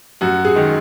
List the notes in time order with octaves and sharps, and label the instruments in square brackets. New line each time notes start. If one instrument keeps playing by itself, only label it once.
[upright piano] F#2 F#4
G#4
D#3 G#3